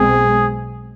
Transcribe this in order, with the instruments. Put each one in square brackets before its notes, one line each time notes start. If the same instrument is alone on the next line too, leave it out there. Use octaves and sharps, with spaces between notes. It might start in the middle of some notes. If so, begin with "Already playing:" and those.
Already playing: [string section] B1 B2 G#3 C4 [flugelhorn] G#4